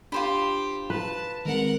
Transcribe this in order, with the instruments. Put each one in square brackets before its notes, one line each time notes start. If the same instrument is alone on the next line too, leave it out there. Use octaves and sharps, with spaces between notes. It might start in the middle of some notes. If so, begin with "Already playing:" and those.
[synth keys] D4 [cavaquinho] F4 C5 B5 [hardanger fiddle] G4
[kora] B4 [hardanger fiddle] A5 [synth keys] E7
[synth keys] D#3 G#3 C4 [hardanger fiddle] A#4 F#5